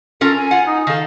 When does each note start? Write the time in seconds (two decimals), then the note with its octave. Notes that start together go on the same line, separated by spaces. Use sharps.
0.21 C#4 F4 A4 A#4
0.36 G#5
0.51 F4 F#5
0.66 D#4
0.87 D#3 A4 F5